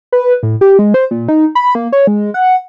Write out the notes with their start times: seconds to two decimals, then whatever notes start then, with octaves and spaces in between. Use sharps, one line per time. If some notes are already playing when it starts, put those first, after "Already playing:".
0.12 B4
0.43 A2
0.61 G4
0.79 G#3
0.94 C5
1.11 A#2
1.28 D#4
1.55 B5
1.75 A#3
1.92 C#5
2.07 G#3
2.34 F#5